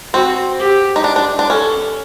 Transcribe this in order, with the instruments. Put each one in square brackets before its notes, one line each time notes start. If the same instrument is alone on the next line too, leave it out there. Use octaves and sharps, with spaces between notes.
[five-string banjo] C4 [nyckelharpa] F#4
[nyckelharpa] G4
[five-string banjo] D#4
D4
D4
D4
[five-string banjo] C#4 [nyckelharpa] A4